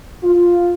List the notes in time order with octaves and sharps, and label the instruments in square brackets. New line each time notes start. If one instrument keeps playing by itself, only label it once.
[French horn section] F4